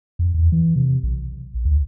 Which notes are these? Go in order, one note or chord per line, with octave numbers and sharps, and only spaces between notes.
F2
E2
E3
C3
B1
D2